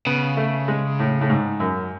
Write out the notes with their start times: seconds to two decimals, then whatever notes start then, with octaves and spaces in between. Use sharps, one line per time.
0.07 C#3 B3
0.37 A3
0.68 G#3
0.99 A2
1.21 A2
1.30 G#2
1.60 F#2